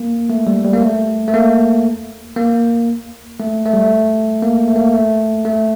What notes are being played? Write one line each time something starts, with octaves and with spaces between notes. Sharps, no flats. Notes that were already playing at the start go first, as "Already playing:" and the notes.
Already playing: A#3
A3
G3
G3
A#3
A3
A3
A#3
A#3
A3
A3
G3
A3
A#3
A3
A#3
A3
A3